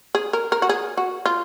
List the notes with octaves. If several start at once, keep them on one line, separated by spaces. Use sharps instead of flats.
G#4
A#4
A#4
F#4
G#4
F#4
F4